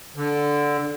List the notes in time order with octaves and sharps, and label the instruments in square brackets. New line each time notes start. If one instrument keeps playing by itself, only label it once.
[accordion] D3